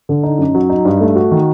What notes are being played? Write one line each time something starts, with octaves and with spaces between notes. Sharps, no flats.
D3
D#4
F#2
F#3
D#4
G2
A3
F#4
D#3